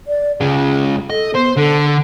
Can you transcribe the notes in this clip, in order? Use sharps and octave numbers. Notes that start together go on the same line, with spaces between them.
D5
C#3 G#3 G#4
A4 D#5
B3 C5
D3 A4